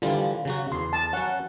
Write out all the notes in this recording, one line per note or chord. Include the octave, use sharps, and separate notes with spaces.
D3 E3 G3 F4
C#3 F#3 F#4
E2 C6
A5
F#3 C#4 F#5